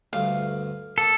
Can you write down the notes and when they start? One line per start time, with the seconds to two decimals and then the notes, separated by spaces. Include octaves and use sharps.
0.13 D2 G2 A3 F5
0.98 A#3 A4